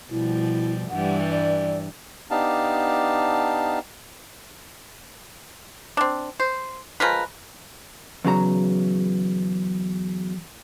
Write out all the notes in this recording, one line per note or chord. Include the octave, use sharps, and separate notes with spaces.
B2 F3 G3 E4
G2 E3 G3 F#5
D5
B3 D4 D#4 G4 F5 A5
C4 D4
C5
F3 G#3 A#4 B4
E2 C#3 F#3 A#5